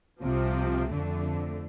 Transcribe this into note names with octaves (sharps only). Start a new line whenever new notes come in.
C2 C3 F3
F2 D3 A3